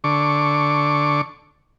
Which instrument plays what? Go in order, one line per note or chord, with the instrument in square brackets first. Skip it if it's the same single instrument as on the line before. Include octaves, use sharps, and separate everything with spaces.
[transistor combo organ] D3 C#6 D6